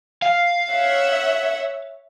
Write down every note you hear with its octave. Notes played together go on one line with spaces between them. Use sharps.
F5
C#5 E5 F#5